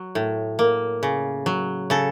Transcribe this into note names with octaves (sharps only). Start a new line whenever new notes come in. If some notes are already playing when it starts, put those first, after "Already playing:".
Already playing: F#3
A2
A#3
C#3
F#3
C#3 A4